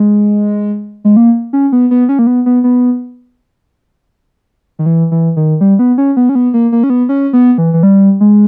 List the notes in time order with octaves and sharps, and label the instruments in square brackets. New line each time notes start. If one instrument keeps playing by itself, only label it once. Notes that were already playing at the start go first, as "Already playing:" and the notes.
Already playing: [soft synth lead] G#3
G#3
A#3
C#4
B3
B3
C#4
A#3
B3
B3
B3
D#3
E3
E3
D#3
G3
B3
C#4
B3
C#4
B3
A#3
A#3
C#4
B3
C#4
B3
E3
E3
G3
G#3